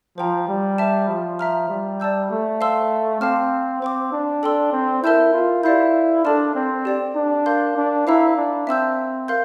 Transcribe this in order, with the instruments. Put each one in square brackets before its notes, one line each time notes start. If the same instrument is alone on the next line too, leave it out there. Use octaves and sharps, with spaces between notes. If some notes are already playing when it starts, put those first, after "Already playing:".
[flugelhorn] F3 [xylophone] C5 G5 A#5
[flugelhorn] G3
[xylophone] C5 E5 A5
[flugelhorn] F3
[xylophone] E5 A#5 F6
[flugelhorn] G3
[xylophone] D5 A5 E6 G6
[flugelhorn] A3
[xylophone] C5 F5 A5 C6 E6
[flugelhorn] C4 [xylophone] F5 A5 D6 F6
[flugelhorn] C4 [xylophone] C5 G5 D6
[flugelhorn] D4
[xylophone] A4 D5 G5 C6 E6
[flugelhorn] C4
[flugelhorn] E4 [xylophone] A#4 E5 A5 E6 G6
[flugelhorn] F4
[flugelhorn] E4 [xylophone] G4 D5 F5 C6 G6
[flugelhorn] D4 [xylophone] A4 D5 A5 C6 F6
[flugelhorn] C4
[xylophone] G4 D5 G5
[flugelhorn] D4
[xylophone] A#4 F5 C6 G6
[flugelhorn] D4
[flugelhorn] E4 [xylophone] C5 F5 A#5 E6
[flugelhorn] D4
[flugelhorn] C4 [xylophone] E5 A5 E6 G6
[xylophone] A#4 F5 C6 G6